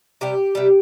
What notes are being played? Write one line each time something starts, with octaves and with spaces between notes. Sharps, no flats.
C3 G3 G4
C3 G3